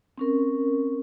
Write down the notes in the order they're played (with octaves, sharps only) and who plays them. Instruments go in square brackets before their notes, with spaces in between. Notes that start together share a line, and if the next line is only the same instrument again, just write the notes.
[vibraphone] C4 C#4 A#4